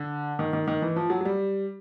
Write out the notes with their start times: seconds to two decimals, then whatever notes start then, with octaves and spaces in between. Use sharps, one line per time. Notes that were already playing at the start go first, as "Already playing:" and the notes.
Already playing: D3
0.39 D#3
0.53 D#3
0.68 D#3
0.82 E3
0.96 F3
1.10 F#3
1.21 F#3
1.25 G3